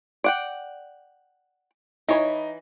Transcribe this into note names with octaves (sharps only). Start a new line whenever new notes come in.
D5 F#5 G5
E3 D#4 C#5 B5